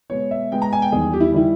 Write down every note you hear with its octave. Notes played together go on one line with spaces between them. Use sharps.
B2 G#3 B3 C#5
E5
B2 G#3 B3 G5
A#5
G#5
G5
E2 D#3 G3 G#4
G4
E4
D#3 G3 E4